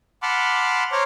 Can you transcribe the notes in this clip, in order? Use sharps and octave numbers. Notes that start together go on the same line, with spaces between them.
F#5 A5 B5 C6 D6 F6
C5 C#5 A#5 C6 D6 F6